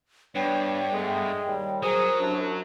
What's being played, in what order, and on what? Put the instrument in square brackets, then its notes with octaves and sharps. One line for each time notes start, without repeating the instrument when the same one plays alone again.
[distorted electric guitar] G2 [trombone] B3 [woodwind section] D4 C#5 [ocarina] G5
[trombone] G#3 [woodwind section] A3 B3
[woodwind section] D#2 G3
[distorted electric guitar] F#3 [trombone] G#4 [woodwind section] A#4 D#6 [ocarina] C5
[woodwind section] C2 D4 [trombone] F#2